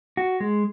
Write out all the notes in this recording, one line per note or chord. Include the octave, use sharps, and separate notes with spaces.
F#4
G#3